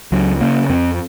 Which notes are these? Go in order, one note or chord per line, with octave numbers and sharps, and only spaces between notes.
C#2 F#3
C#3 A#3
F2 C4